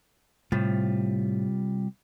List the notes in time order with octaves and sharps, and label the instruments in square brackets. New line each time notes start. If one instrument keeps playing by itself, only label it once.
[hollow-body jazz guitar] A2 [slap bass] C3 [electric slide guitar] G3 F4